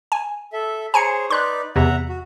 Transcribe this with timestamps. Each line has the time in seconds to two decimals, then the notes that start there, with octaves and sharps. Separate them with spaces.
0.12 G#5
0.53 A4 E5
0.94 G#4 C5 C#5 G#5 A#5 C#7
1.30 D#4 B4 D5 C6 F#6
1.76 E2 C3 E5 F#5 A#5
2.09 F#4